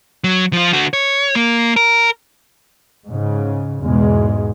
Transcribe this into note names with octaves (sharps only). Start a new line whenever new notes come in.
F#3
F3 F4
D3 F#4
C#5
A#3
A#4
G#2 C#3
E2 G#2 B2 G#3